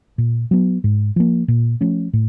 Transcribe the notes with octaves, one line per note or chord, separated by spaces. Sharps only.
A#2
F#3 B3
G#2
F3 A#3
A#2
F3 A3 C#4
A2